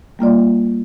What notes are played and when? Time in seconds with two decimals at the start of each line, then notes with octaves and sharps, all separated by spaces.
0.19 G3 A#3 F4 D5